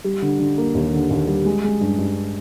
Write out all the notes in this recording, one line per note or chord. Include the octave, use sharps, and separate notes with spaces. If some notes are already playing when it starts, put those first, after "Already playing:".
G3
D3
D3
A#3
D#2
D3
D#2
G3
G#3
G#3
G2
G2